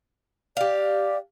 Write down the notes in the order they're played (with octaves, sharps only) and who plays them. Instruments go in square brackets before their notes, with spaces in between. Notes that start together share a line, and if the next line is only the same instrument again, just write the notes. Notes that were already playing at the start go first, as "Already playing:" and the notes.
[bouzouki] G4 F5 [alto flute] D5